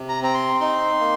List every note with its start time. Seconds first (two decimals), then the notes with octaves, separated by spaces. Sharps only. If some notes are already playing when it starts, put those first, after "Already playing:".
Already playing: C3
0.09 A#5
0.22 C4 A#5
0.34 C6
0.60 D#4 C6
1.00 A#3